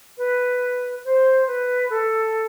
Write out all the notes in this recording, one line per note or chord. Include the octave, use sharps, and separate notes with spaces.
B4
C5
B4
A4